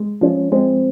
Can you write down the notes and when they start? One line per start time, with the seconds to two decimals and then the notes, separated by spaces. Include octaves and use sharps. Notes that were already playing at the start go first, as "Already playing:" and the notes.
Already playing: G#3
0.21 F3 C#4
0.52 G#3 C4